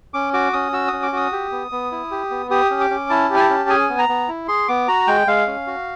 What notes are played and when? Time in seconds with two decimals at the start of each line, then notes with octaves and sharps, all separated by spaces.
0.14 C#4 D6
0.33 F#4 D6
0.53 C#4 D#6
0.72 F#4 E6
0.88 D#6
0.93 C#4
1.03 D6
1.13 F#4 D#6
1.32 G4
1.52 B3
1.72 B3
1.92 E4
2.11 G4
2.30 B3
2.50 G4 D#6
2.71 C#4
2.81 D6
2.90 C#4
3.10 E4 A5
3.30 G4
3.36 G#5
3.40 A5
3.50 C#4
3.69 G#4 G#5
3.89 B3
3.99 A#5
4.09 B3
4.28 E4
4.48 G#4 C6
4.68 B3 D6
4.88 F#4 A#5
5.07 G#3 G5
5.27 G#3 F5
5.47 C#4
5.67 F#4